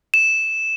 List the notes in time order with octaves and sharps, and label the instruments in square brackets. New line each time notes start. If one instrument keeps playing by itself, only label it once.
[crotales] E7